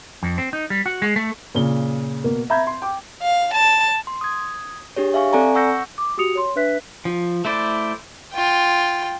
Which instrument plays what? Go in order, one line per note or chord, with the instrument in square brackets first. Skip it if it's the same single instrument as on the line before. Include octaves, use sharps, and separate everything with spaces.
[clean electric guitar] F2
C4
D#4
G3
F#4
G#3
A3
[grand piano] A#2 C#3 G7
B2 A#3
E5 A#5 B5 G6 G#6
C6
G5 D6
[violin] F5
A5
[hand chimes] C6
D#6 G#6
D4 G4 G#4 C#5
E5 F5 G#5 C#6
C4 A4 D5 G#5 A#5
F#5 C#6 E6 G6 A#6 C#7
[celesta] D6
F#4 G4 D#6 C#7 F7
C#5 C6
D4 B4 E5 F#6 B6
[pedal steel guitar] F3
A3 E4 C5 D5
[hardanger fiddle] F4 G5